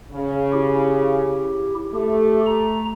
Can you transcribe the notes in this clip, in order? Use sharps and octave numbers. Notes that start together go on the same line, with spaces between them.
C#3
E4 G4
A3 G4
A#5